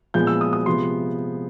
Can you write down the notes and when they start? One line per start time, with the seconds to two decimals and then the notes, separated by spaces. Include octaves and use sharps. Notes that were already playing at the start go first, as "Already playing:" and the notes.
0.14 A#2 F3 G#3 B3 G6
0.27 E6
0.41 D#6
0.53 D#6
0.66 C3 F3 G#3 B3 C6